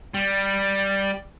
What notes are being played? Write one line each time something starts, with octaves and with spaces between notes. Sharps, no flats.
G3